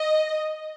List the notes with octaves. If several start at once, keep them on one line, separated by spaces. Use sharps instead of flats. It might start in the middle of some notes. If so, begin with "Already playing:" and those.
Already playing: D#5